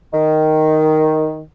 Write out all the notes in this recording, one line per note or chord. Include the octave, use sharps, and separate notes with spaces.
D#3